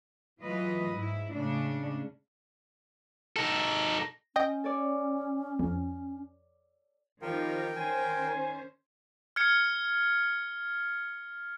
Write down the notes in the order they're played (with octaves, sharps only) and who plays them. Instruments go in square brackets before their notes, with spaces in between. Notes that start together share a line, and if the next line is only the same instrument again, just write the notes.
[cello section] E3 F#3 G#3 F4 B4 D#5
G#2 E4
A2 C#3 G#3 C#4 D4
[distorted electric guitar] D#4 A4
[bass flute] C#4 [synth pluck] D#5 G5
[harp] A4 C#5 D5
[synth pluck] F2
[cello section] D#3 C4 D#4 [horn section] F3 G3 [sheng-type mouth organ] A#4 G5
[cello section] D#3 C#4 C5 [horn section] G#5
[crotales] F6 G#6 C#7